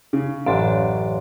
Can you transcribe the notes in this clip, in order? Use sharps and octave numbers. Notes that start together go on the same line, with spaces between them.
C#3
A1 F#2 D4 F5 C6